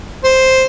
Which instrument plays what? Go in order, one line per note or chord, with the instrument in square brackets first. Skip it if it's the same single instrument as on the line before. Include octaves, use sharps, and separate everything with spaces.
[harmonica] C5